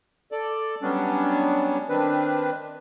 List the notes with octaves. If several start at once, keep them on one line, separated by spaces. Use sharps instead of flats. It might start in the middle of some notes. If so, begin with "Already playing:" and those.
A4 D5
F#3 G3 B3 C#4 D4
D#3 C4 D4 B4